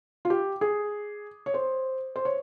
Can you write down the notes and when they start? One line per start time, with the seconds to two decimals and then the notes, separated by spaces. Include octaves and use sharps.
0.25 F4
0.30 G4
0.61 G#4
1.46 C#5
1.54 C5
2.16 C5
2.25 C#5